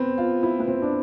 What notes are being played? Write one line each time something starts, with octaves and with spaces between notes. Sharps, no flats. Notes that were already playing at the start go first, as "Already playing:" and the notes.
Already playing: B3 C4
F4
E4
B3
C4
D4